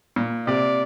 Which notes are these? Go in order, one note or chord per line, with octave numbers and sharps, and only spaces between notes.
A#2
C3 D5